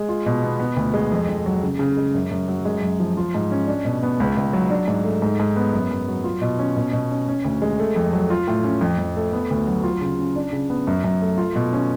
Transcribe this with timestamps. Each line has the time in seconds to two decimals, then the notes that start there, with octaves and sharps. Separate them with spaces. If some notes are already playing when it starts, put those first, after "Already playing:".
Already playing: G#3
0.09 F4
0.26 B2
0.43 B3
0.59 B3
0.76 D2
0.94 G#3
1.12 F2
1.29 F2
1.46 F#3
1.63 C#3
1.79 C#3
1.97 G#3
2.14 F#2
2.31 F#2
2.48 F#3
2.65 G#3
2.82 F#2
3.00 F3
3.17 F4
3.34 G#2
3.51 C#4
3.67 D4
3.85 B2
4.03 B3
4.20 C#2
4.37 C#2
4.53 F#3
4.70 D4
4.88 G#2
5.04 A3
5.22 G#2
5.40 G#2
5.56 B3
5.73 F#2
5.91 F#2
6.08 F#3
6.24 F4
6.42 B2
6.59 C#4
6.77 B2
6.93 B2
7.11 C#4
7.28 C#4
7.45 D2
7.62 G#3
7.79 A3
7.96 F2
8.12 F#3
8.30 F4
8.47 A2
8.64 C#4
8.81 F2
8.99 F2
9.16 A3
9.33 B3
9.50 D2
9.67 F#3
9.84 F4
10.01 C#3
10.19 C#4
10.36 D4
10.53 C#3
10.70 B3
10.87 F#2
11.04 F#2
11.22 A3
11.38 F4
11.55 B2
11.73 C#4